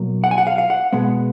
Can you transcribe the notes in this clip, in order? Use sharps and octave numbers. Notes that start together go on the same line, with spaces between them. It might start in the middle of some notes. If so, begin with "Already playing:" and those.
Already playing: B2 F#3 A#3
F#5
G#5
F#5
F5
F5
F#5
B2 G#3 B3